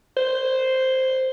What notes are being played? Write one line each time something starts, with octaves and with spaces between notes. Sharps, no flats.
C5